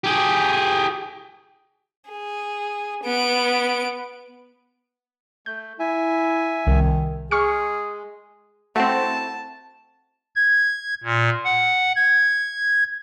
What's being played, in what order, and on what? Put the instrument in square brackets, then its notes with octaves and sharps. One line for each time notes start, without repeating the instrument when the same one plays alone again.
[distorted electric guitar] G4 G#4
[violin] G#4
B3 D7
[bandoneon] A3 [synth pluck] G6
[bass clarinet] E4 [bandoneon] E5 G#5
[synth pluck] C2 [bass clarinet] D#3
[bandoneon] G#3 [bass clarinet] G#4 [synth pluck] C#6 F6 C#7
[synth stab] A3 C4 [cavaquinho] E4 F#4 [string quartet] A5
[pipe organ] G#6
A#2
F#5
G#6